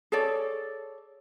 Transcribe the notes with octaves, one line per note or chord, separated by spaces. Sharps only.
G#4 A4 C#5 D5